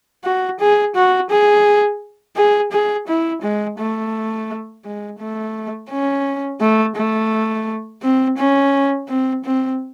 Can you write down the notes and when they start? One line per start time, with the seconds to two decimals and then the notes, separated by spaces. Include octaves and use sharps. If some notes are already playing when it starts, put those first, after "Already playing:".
0.25 F#4
0.60 G#4
0.95 F#4
1.30 G#4
2.36 G#4
2.72 G#4
3.08 E4
3.42 G#3
3.78 A3
4.85 G#3
5.19 A3
5.90 C#4
6.61 A3
6.96 A3
8.03 C4
8.37 C#4
9.08 C4
9.44 C4